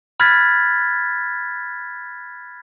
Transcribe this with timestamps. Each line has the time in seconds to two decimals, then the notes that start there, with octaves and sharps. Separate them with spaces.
0.20 B5 F6 F#6 G#6 A6 B6